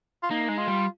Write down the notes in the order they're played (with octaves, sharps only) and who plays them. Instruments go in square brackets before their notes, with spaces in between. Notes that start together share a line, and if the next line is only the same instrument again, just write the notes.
[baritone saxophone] F4
[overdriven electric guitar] A#3 [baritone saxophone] D#4
[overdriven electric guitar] G#3
[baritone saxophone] F4
[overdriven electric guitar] G3